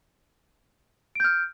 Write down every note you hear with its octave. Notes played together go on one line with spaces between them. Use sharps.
F6 G6 D7